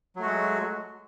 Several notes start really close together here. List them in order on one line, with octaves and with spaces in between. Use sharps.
F#3 A3 F#4 G#3